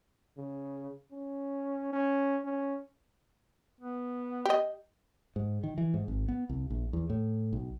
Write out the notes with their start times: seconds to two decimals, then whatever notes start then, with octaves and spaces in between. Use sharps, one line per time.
0.38 C#3
1.12 C#4
1.93 C#4
2.45 C#4
3.81 B3
4.45 G4 D#5
5.36 G#2
5.63 D#3
5.78 E3
5.94 G#2
6.08 G#1
6.28 B3
6.49 C2
6.70 A#1
6.93 E2
7.10 A2
7.53 B1